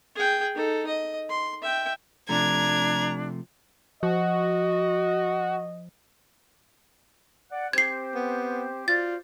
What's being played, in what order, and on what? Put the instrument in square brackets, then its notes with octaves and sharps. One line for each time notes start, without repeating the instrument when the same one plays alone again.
[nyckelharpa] G#4 G5
D#4 A4
D#5
C6
E5 G5
[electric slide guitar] C3 F3 A3 [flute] D4 [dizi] A#5 [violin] G#6
[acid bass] F3 [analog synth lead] F#4 [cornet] D#5
[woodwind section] D5 F#5
[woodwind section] C4 G4 C5 [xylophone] G#6 C7
[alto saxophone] B3
[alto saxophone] F4 [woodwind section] F#4 C5 D5 [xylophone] A6